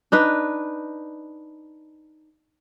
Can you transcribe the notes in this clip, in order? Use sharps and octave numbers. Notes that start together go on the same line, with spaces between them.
D4 D#4 B4